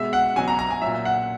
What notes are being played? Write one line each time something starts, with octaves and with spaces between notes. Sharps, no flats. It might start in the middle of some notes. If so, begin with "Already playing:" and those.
Already playing: B2 G#3 E5
F#5
B2 F#3 G#5
A#5
A#5
G#5
A#2 F#3 E5
F#5